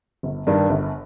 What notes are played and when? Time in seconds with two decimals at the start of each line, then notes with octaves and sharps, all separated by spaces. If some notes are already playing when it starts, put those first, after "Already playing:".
0.23 G1
0.47 G2 D#3 G3 D4
0.69 G1